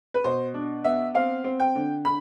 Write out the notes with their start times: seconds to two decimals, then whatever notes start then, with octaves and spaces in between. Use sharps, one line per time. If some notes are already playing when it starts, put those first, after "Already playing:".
0.14 B4
0.24 B2 C5
0.54 D4
0.84 B3 E5
1.14 C4 F5
1.44 C4
1.60 G5
1.75 D3
2.05 D3 B5